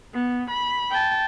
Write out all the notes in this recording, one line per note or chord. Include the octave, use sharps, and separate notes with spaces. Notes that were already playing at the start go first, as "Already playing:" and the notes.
B3
B5
G5 A5